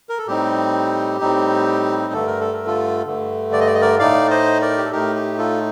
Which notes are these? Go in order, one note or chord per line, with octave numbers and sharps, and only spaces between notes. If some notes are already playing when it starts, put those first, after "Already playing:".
A#4
A4
A2 G3 C4 D#4 G4
A2 G3 C4 D#4
G2 D3 A3 A4
A#4
A4
A#4
F4 A4
G2 D3 A3
D5
D#5
D5
D#5
A#4 D5
A2 A3 D#4 D5 F5
C5 D#5
A#4 D5
G4
A4
A2 A3 D#4 G4 A#4
G4
F4 A4